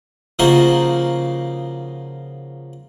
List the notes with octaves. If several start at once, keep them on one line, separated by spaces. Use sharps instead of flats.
C#3 F3 A#3 D#4 F#4